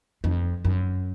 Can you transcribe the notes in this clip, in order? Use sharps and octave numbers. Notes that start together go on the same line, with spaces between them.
F2
F#2